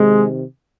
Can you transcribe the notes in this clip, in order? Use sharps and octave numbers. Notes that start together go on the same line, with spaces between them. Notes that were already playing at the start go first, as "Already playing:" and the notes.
Already playing: C3 D#3 G#3